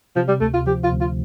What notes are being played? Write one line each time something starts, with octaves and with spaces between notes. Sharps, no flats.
C3 F3
G3
D2 A3
F4
F3 G4
F4
D2
F4